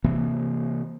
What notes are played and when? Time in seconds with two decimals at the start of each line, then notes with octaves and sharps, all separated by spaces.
0.04 C3 E3 A#3